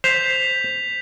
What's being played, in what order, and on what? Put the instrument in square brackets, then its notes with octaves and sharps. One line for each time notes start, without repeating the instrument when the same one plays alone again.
[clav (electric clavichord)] C5 [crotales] G6 B6 F7